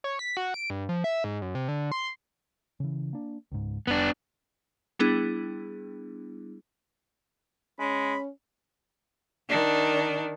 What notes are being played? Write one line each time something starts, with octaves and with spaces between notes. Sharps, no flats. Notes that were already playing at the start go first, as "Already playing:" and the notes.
C#5
B6
F#4
D7
G2
F3
E5
G#2
F#2
C3
D3
C6
C#3 E3
A#3 D4
C#2 G#2
F1 B3 D4
G3 B3 D4 E4 G#4
G#3 C#4 B5
D#3 D4